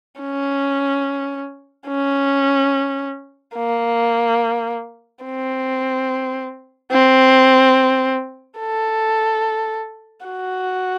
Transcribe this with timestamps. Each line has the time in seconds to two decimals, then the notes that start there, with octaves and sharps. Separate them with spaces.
0.20 C#4
1.88 C#4
3.56 A#3
5.24 C4
6.92 C4
8.59 A4
10.26 F#4